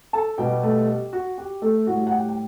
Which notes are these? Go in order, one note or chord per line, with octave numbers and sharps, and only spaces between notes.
A4 A5
B2 G3 G4 G5
A3 A4
G4
F#4
G4
A3 A4
A2 G3 F#4 F#5
F#5
G4 G5
G5